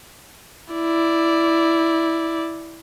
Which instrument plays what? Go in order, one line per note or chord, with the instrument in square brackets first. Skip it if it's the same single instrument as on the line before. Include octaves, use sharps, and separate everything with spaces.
[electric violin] E4 D5